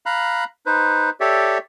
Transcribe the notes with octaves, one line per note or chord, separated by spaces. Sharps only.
F5 A#5 B5 F#6
D#4 B4 C5
G4 A4 C#5 D5 E5